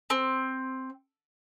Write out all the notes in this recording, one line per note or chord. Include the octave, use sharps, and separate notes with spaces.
C4